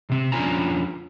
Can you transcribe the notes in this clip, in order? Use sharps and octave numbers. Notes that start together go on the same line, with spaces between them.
C3 C4
F2 C#4 D4 F4 G#5 A#5